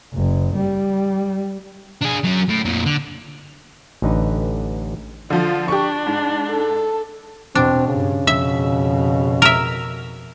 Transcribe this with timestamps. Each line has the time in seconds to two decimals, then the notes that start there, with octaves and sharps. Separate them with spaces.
0.15 F#1
0.56 G3
2.02 D4 G#4
2.24 F#3 C#4
2.49 A2
2.65 F2 A#2
2.86 D3
4.02 A1 D3 D#4 B4
5.30 D3 F3 F4
5.68 D4 G4 C#6
6.07 G#2
6.49 A4
7.55 E2 B2 C4 D4
7.88 G2 C#3
8.27 F2 B2 E5
9.42 A#4 E5